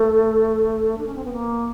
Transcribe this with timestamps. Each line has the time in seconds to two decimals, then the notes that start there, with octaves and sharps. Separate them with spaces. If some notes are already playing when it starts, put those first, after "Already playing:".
Already playing: A3
0.98 D4
1.06 C#4
1.15 C4
1.25 B3
1.33 A#3